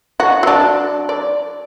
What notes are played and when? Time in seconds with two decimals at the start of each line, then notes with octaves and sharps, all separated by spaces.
0.20 F#4
0.43 F#3 D4
1.09 D5